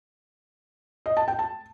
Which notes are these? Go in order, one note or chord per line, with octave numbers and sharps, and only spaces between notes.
D#5
A5
G5
A5